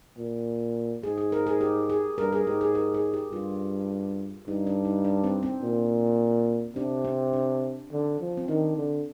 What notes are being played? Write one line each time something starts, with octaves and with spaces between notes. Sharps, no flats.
A#2
G#2 G#4
G#4
A#4
G#4
G4
G#4
G2 A#4
G#4
G#2 G4
G#4
A#4
G#4
G4
G2 F4
G2 D#4
D4
D#4
D4
C4
C4
A#2
C3 D4
C4
D4
D3
F3
C4
D#3 D4
D3